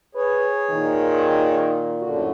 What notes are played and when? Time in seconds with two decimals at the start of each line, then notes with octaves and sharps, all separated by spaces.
0.15 G#4 B4 C#5
0.70 A#2 D#3
2.02 F#2 A2 D3 F#4